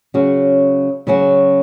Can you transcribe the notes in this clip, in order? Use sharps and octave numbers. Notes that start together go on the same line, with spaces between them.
C#3 F#3 C#4 F#4
C#3 F#3 C#4 F#4